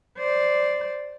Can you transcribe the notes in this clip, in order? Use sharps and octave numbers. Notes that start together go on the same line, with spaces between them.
C5 D5